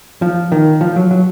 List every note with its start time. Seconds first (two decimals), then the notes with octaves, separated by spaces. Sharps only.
0.22 F3
0.52 D#3
0.81 F3
0.96 F#3
1.11 F#3